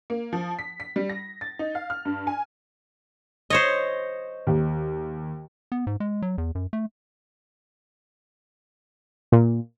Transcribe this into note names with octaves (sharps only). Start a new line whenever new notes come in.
A#3
F3
B6
B6
G3
A#6
A6
D#4
F5
F6
G2
G#5
C5 C#5 D#5
D#2
B3
G#2
G#3
F#3
E2
F#2
A3
A#2